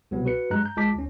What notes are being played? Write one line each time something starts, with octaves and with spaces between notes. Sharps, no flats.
C2 B2 F#3 B3
F#4 B4 C#7
G2 F#3 G#3 A#5 F#6
A#5 G6
A#1 G#3 F4 A5 D6 B6
D2 C#4